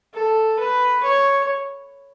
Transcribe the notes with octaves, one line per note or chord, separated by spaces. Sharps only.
A4
B4
C#5